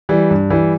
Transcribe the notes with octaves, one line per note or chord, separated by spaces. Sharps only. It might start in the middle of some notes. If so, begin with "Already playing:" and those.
E3 G3
G2
E3 G3